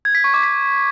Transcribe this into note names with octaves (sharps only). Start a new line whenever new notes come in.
G#6
B6
C#6
D6
B6